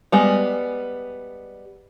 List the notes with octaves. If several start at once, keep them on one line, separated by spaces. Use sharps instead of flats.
G3 G#3 B3